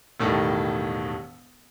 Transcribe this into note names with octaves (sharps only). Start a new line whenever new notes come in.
E1 A2 D#3 G3 A4